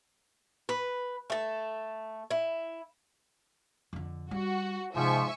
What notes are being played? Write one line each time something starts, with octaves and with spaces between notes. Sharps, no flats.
B4
A3 A4
E4
F2 D3
G3 F#4
G#2 C3 F3 E5 G#5 C#6